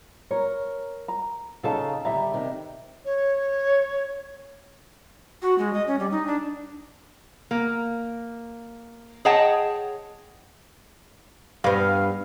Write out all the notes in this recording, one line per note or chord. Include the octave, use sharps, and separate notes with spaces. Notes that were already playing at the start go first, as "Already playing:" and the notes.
A#4 C#5
A#5
C#3 D#4 A4 F5 A5
D3 G3 E5 A#5
C3 D#3 D4
C#5
F#4
G#3
D#5
C#4
G3
D#4
D4
A#3
G#4 C#5 D#5 F#5 G5 A5
G2 B3 F5